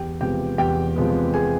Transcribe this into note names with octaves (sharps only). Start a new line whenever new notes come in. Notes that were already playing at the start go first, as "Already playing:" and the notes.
Already playing: E2 G4 G5
C3 F3 G#3 B3 G4 G5
E2 G4 G5
C3 F3 G#3 B3
G#4 G#5